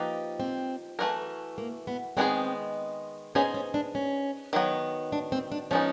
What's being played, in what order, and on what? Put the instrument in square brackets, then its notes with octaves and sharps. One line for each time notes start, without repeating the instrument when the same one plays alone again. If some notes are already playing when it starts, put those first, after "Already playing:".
Already playing: [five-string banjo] F3 A#3 D#4 G4 B4
[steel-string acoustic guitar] C4
[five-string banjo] E3 A3 C#4 F#4 A#4
[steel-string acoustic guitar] A#3
B3
[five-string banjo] D#3 G#3 B3 E4 G#4 [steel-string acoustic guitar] C4
[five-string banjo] B3 D#4 G#4 C5 D#5 [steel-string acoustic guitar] C#4
[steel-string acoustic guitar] C#4
D4
C#4
[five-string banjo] D#3 F#3 B3
[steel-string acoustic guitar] D4
C4
D4
[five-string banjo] F3 G#3 B3 D#4 [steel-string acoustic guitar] C#4